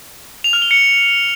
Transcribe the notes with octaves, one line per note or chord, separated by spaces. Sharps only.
F7
F6
G7
C#7